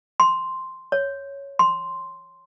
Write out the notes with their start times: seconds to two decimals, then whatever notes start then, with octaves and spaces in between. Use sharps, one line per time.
0.20 C6
0.92 C#5
1.59 C6